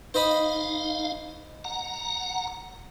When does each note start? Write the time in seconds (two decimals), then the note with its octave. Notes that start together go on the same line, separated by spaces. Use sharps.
0.14 D#4 C5 D#5 F5 B5
1.64 F#5 A#5